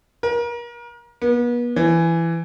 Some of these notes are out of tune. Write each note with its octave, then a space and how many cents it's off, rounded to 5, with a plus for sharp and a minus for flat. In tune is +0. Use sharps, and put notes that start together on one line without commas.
A#4 +35
B3 -40
E3 +15